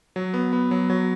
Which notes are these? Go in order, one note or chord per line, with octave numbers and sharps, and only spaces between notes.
F#3
B3
B3
F#3
F#3